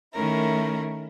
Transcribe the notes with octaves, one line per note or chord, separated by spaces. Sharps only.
D#3 A3 C#4 E4 A#4